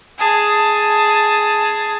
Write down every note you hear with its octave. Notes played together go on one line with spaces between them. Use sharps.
G#4 A5